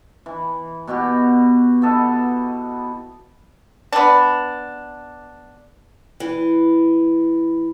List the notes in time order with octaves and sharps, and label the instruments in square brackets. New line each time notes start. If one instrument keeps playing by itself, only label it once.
[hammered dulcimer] E3
B2 B3 F#4 G4
B3 E4 A4 D#5
[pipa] B3 D4
[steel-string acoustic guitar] E3